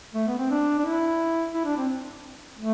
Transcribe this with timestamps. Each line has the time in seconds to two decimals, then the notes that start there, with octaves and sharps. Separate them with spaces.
0.14 A3
0.27 B3
0.38 C4
0.50 D4
0.79 D4
0.85 E4
1.54 E4
1.65 D4
1.77 C4
2.58 A3